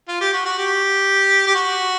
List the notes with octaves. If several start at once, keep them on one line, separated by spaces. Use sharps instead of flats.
F4
G4
F#4
F#4
G4
G4
F#4